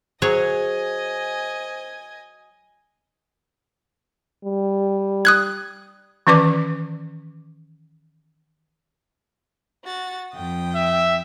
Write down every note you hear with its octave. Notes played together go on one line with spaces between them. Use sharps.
F#3 G#4 C5 C#5 D#5 G#5
G3
D#6 F#6 G#6
D#3 E3 C#4 B4 D5 D6
F#4 A6
F2 G5 D#6
E5